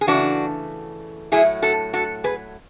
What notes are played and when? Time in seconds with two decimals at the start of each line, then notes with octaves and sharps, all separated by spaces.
0.01 G#4
0.07 C#3 E3 A3 D4 F#4
1.32 A2 F#3 A3 E4 G#4
1.62 F#4 A4
1.93 F#4 A4
2.24 G#4 B4